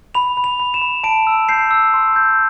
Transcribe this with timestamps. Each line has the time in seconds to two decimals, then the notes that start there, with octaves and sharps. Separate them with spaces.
0.15 B5 F7
0.37 B5
0.44 F7
0.60 B5
0.74 E7
0.82 B5
1.04 A5 D7
1.27 E6
1.49 G6 C7
1.71 E6
1.94 C6
2.16 G6